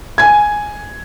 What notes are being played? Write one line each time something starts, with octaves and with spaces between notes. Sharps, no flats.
G#5 G#6